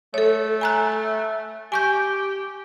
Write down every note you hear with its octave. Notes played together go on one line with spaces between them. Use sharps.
A3 A4 C#5
G#5 A#5 F#6
G4 G#5 C#6 G6